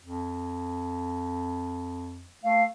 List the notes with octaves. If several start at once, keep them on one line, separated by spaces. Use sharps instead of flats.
F2
A3 F5